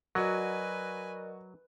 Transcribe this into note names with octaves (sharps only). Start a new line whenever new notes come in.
F#3 F#4 A#4 B4 D5 D#5 G#5